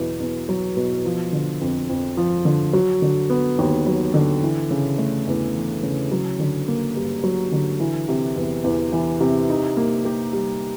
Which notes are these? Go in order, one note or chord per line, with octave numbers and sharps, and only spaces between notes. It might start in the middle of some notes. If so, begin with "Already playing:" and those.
Already playing: E2 B2 F#3
E2
F#3
B2
F3
D3
F2
F2
F3
D3
F#3
D3
B3
D#2
F#3
D3
E3
C#3
A3
E2
E3
C#3
F#3
D3
A#3
G2
F#3
D3
E3
C3
E2
E2
E3
C3
D#4
A#3
G4
G3